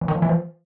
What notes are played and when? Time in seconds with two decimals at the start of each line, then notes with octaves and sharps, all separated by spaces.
0.01 E3
0.08 D#3
0.15 F3
0.22 E3
0.29 F3